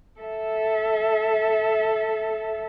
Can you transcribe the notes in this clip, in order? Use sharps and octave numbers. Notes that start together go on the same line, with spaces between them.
A4 E5